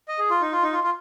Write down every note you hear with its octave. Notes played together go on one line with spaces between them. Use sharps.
D#5
G#4
F4
D#4
F4
D#4
F4
F4